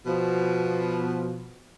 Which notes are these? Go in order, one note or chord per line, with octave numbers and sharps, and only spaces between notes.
B2 F3